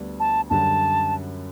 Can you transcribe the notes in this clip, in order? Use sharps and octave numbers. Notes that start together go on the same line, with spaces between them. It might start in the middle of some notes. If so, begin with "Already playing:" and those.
Already playing: D2 D3 G3 B3 D4
A5
F#2 D3 G3 A5